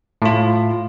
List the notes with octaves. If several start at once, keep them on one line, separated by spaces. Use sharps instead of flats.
A2 F4